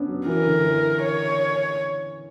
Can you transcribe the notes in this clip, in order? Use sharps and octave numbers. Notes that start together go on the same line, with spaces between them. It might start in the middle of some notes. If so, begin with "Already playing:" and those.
Already playing: B3 C#4 D4
F#3
E3 A#4
D3
E3
C#5